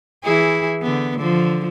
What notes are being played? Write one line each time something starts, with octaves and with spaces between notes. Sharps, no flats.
E3 E4 G#4
D3 B3
D3 F3